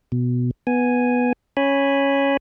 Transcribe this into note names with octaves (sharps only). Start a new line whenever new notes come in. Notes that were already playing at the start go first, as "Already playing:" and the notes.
B2
B3 G#5
C#4 C#5 G#5 B5